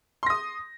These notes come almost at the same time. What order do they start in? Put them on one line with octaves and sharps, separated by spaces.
C6 A#6 D#6